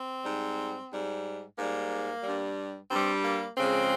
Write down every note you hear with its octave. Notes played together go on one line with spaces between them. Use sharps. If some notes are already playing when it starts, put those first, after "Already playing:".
Already playing: C4
G#2 G3
G#2 G3
G#2 G3 A#3
G2 G3
G2 G3 C4
A#3
F2 C#3 G#3 C4